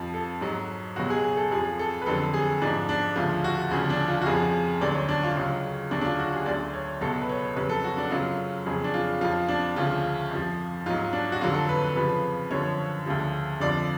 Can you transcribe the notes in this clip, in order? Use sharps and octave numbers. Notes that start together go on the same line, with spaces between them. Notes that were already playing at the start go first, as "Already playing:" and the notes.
Already playing: F2 F3
A4
G#2 F#3
C#2 B2 F#3 F#4
G#4
G#4
A4
F2 F3 G#4
A4
B4
F2 D3 F#3 A4
G#4
G#2 F3 D4
D4
D2 C#3 F3 F4
F#4
D2 C#3 F3 G#4
D4
F4
F#4
F2 C#3 F3 G#4
D2 D3 F#3 D5
C#5
D4
F4
C#2 C#3 F#3
D2 C#3 F#3 D4
D4
F4
F#4
G#4
D2 D3 F#3 D5
C#5
C#2 B2 F#3 A4
B4
C#5
F2 C#3 F#3 B4
A4
F#4
D4
F#2 C#3 F#3 F4
F2 C#3 F#3 G#4
D4
F4
F2 F3 F4
D4
D2 C#3 F3 F4
F2 F3
G#2 F#3 F4
D4
F#4
F2 D3 F#3 F4
A4
B4
B4
F2 C#3 F3 B4
F#2 D3 F3 C#5
D2 C#3 F3
F2 D3 F3 D5